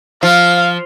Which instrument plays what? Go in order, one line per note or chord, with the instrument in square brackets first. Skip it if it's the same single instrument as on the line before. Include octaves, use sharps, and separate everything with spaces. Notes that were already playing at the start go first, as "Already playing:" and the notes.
[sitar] F3 [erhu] F5